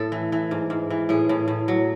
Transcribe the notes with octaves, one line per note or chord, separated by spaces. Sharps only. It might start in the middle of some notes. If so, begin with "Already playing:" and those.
Already playing: A2 A4
E3
E3
G#2
G#2
E3
A2 G#4
A2
A2
F#3